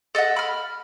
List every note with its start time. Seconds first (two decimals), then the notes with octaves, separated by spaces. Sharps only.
0.15 A4 D#5 E5 F#5
0.36 B5 F6